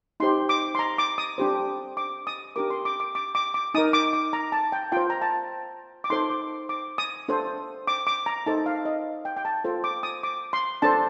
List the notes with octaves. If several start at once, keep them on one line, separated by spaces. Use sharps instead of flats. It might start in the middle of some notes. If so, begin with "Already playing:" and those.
D#4 G4 C5 C6
D6
C6
A#5
D6
D#6
D4 G4 C5
D6
D#6
D4 G4 A#4 D6
C6
D6
D6
D6
D6
D6
D#4 A#4 D#6
D6
D6
A#5
A5
G5
F4 C5 G5
A#5
A5
D6
D#4 A4 C5 C6
D6
D6
D#6
D4 A4 C5
D6
D6
A#5
D#4 A4 C5 A5
F5
D#5
G5
G5
A5
F4 A4 C5
D6
D#6
D6
C6
D4 A4 C5 A5